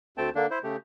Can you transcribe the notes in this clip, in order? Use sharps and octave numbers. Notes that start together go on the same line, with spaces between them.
D2 A3 C4 G5 A5
D3 A#3 D4
E4 C5
C#3 A3 G4